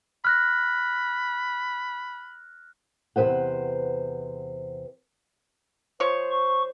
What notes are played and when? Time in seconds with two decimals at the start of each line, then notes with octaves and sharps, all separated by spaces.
0.25 B5 F6 F#6 A#6
3.16 E2 C3 D#3 B4 C5 F#5
6.00 F3 C5 C#5
6.31 C#6